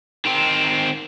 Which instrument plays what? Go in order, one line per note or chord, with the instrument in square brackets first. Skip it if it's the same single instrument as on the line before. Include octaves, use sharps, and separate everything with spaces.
[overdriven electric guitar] D#3 C4